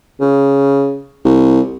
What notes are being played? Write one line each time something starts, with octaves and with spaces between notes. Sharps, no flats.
C#3
C2